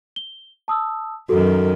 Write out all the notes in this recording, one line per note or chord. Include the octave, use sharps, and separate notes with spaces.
G7
A5 D#6 E6
F#2 D#3 F#4 A4